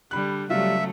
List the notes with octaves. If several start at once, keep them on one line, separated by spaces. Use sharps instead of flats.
D3 G3 B5 F#6
C#3 F#3 G3 A3 F4 E5